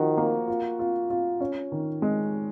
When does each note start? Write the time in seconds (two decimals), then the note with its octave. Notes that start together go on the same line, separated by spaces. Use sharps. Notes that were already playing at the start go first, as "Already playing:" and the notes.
Already playing: D#3 F3 F#4
0.17 A#3
0.48 F4
0.79 F4
1.10 F4
1.40 C#4
1.72 D#3
2.02 G#3